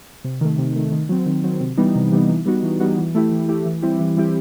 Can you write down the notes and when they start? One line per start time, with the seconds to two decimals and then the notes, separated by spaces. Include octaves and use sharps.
0.24 C3
0.41 D#3 A3
0.58 C3
0.76 D#3 A3
0.92 D#3
1.09 F#3 C4
1.26 D#3
1.44 F#3 C4
1.61 C3
1.77 E3 G3 B3 D#4
1.95 C3
2.12 E3 G3 B3 D#4
2.29 E3
2.46 G3 B3 D#4 F#4
2.63 E3
2.80 G3 B3 D#4 F#4
2.98 E3
3.15 A3 E4 G4
3.31 E3
3.48 A3 E4 G4
3.65 E3
3.82 G3 C4 E4 G4
3.99 E3
4.17 G3 C4 E4 G4